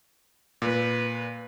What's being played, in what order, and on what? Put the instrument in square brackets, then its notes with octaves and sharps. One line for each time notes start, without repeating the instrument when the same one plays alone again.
[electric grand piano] A#2 [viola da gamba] B4